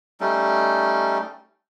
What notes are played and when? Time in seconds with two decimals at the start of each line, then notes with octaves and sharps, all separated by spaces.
0.20 G3 A3 C#4 D#4